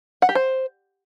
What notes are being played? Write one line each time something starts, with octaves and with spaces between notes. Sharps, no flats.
F#5
G4
C5